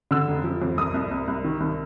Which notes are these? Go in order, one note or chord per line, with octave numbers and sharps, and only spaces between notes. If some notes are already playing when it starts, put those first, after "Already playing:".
D3 E6
F1
F3
F2
C2 D#6
C2
C2
C2
D#3
C2